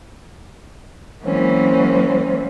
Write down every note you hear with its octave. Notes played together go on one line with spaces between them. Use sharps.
E3 F#3 G#3 A#3 C4 C#4